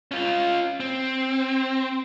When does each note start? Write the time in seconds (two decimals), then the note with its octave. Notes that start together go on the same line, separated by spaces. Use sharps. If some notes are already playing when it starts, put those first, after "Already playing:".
0.11 C#4 F4
0.80 C4